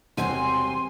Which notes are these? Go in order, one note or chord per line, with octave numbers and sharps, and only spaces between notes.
E1 C3 G3 C4 F#5 G#5 C6